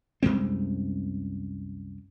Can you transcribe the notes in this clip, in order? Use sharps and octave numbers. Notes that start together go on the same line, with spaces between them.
C2 F#2 G#3 C4